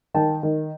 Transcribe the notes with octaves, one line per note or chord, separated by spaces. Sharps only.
D#3 G5 A5
D#3